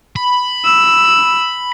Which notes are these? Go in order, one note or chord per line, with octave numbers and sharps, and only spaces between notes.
B5
E6